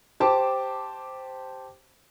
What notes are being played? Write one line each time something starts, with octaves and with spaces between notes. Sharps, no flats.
G4 C5 A5 D6